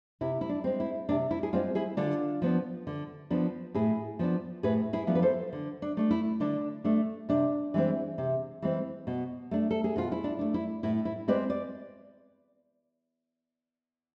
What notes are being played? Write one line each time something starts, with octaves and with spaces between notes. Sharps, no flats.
C3 E4
E4
D4
G#3 C4
E4
C3 D4
E4
G#4
G#3 C4 D4 F4
E4 G#4
D3 D4 F4
F3 B3 D4
D3
F3 B3 D4
A2 E4 G#4
F3 B3 D4
A2 G#4 B4
E4 G#4
F3 B3 D4
B4
A4 C5
D3
D4
A3 D4
E4
D3 D4
A3 D4
C3 D4
E3 G#3 C4
C3
E3 G#3 C4
B2
A3 D4
A4
G#4
B2 F4
E4
D4
A3 D4
E4
A2 E4
E4
G#3 C4 B4 D5
D5